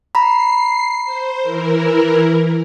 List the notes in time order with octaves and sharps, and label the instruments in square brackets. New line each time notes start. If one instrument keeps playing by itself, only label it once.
[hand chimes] A#5 B5 [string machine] C7
[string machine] C5
E3 E4 A#4